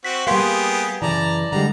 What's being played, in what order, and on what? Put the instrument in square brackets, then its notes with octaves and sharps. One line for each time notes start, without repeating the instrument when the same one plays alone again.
[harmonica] C4 F#4 [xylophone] B6
[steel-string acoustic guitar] G3 A#3 [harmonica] B3 G4 G#4 [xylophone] F5 C6 B6
[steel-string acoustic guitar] F#2 C#3 E3 [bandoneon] D5 A5 [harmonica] A#5
[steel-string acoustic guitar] D3 G3 G#3 [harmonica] A#5